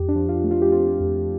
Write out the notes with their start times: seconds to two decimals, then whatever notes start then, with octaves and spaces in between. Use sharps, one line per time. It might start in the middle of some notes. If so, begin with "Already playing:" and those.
Already playing: F2 G4
0.08 D4
0.15 F3
0.29 F4
0.44 A3
0.51 F4
0.62 G4
0.72 C4 F4
1.00 F2